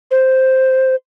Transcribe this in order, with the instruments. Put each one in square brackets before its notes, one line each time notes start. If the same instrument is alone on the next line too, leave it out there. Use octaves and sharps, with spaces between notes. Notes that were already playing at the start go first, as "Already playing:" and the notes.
[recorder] C5